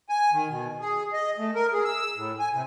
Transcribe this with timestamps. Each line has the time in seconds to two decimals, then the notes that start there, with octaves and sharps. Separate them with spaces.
0.09 G#5
0.32 D#3
0.49 B2
0.80 G#4
1.13 D#5
1.38 A3
1.55 A#4
1.73 G#4
1.84 E6
2.17 A2
2.39 G#5
2.53 C3